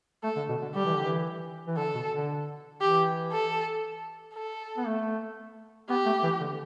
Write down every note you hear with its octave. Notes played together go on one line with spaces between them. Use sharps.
A3 A4
D3
B2
D3
G3 G4
E3
D3
E3
E3
D3 A4
B2
D3
E3 G4
A4
A4
B3
A3
B3 G4
A3
E3
D3